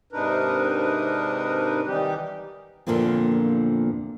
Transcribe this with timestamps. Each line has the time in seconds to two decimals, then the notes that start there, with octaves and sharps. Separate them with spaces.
0.12 G#2 C3 D4 D#4 A#4 B4
1.87 D#3 E3 G3 D#4 G4
2.87 E2 A#2 D3 F3 A#3 C4